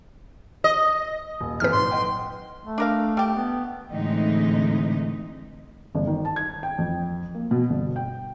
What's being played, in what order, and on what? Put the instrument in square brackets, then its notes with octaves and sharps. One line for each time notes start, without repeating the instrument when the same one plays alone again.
[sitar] D#5
[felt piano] D#1
[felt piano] E2 C3 A4 [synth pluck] B4 F6
[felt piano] A#2 D#3 F#3 [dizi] C6
[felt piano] D#5 F#5 G5
[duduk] A3
[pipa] D4 A#4 F5
G3 G4
[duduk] B3
[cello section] A2 D3 E3 G#3 C4 D#4
[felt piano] G1
D#3
A5
G#6
G5
F2
A#3
B2
G1
G5